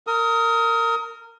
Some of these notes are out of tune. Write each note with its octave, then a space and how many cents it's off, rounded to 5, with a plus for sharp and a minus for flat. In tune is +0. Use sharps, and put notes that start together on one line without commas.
A#4 -20 D#6 +25